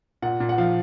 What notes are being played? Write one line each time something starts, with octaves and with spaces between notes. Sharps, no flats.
A#2 F#5
A#2
F#5
F3 F5